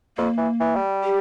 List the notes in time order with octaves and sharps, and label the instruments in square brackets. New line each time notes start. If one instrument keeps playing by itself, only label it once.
[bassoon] F2 [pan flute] A#3
[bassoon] E3
E3
G3
[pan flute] G4